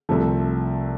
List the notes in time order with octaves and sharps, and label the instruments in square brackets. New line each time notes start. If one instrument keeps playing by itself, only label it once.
[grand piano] C2 C3 F3 A3